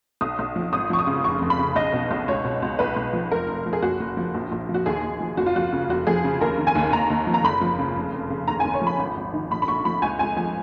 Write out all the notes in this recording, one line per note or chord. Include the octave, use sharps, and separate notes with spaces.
B1 D#6
B1
F3
G#1 D#6
F3 C#6
D#6
C#3
F1 C#6
F1
B5
C#3
B1 D#5
B2
B1
C#2 C#5
B2
C#2
B1 B4
B1
F3
F1 A#4
F1
F3
G#4
F#1 F#4
F#1
F3
A#1
A#1
F3
F#4
D#2 G#4
D#2
F3
F#1 F#4
F4
F3 F#4
C#3
F1 F#4
F3 G#4
C#3
D#2 A#4
D#3
G#5
D#2
D#2 A#5
D#2
F3
A#5
F#1 B5
F3
C#3
F1
F1
C#3
D#2 A#5
G#5
D#2
C#5
F3
B5
G#1
G#1
D#3
A#1 B5
B5
A#1 C#6
F3 B5
C#2 G#5
C#2 G#5
F3 G#5